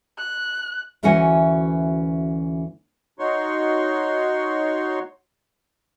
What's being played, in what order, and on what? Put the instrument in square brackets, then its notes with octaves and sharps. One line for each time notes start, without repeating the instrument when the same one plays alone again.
[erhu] F#6
[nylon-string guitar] D2 E3 C#4 F#4 F#5 G#5
[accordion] D#4 F#4 C#5 C6 C#6